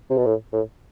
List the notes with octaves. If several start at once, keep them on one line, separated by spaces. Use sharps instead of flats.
C3
B2
A2
A2